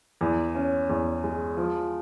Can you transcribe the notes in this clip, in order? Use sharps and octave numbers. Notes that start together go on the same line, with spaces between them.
E2
C#4
E2
G#3
F3